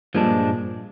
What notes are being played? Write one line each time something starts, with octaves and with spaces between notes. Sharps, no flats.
G2 A#2 F3 G#3 D4